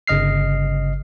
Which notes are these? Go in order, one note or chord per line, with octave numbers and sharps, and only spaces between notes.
G1 C#3 D#5 F6 C7